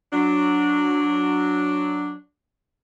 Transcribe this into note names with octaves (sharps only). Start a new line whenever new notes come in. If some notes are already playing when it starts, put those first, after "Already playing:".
F#3 D4